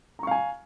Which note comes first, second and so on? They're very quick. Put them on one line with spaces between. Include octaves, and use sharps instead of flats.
A#5 C#6 F5 G#5